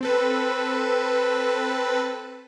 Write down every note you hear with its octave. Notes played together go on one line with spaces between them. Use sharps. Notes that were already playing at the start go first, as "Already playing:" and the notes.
C4 A4 B4